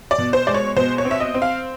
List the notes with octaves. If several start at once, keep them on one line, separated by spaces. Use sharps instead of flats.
D5
B2
C5
G#3 D5
C#5
B2 C5
C#5
C4
E5
D#5
C4
F5